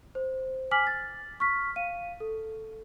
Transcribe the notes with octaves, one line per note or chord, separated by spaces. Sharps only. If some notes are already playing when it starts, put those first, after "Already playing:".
C5
G#5 D6 F6 B6 F#7
A6
C#6 F6 B6
F5 D#7
A4